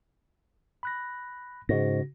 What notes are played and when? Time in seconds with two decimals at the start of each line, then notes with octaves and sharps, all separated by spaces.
0.83 B5 F#6 A#6
1.69 G#2 C#3 F#4 A#6